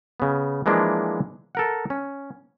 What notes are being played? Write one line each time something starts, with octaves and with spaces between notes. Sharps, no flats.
C#3 B3
E3 F3 G#3 A#3 D4 E4
A4 A#4 F#5
C#4